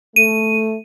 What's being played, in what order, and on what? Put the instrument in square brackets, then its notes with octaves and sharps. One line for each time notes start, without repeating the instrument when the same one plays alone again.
[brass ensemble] A3 [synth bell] D#7